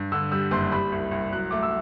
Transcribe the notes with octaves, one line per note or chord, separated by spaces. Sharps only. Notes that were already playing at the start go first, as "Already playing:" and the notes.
Already playing: G2
D3 E6
G3 E6
F#1 C6
G3 B5
C2
C2
F#3 F#6
A3 D6
E6